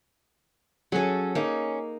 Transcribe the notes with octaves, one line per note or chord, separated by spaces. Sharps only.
F#3 C#4 G#4 A4
A#3 C#4 D#4